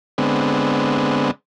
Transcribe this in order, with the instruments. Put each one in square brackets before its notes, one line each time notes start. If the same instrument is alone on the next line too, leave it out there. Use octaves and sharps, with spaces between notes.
[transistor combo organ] D3 G#3 B3 C4